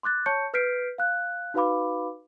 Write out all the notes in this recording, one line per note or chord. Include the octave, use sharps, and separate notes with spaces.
C6 D6 F#6 A6
C#5 A5 C#6 G6 C#7
B4 F6 G6 B6 C7 D7
F5 F#6
D#4 F#4 B4 F5 B5 D6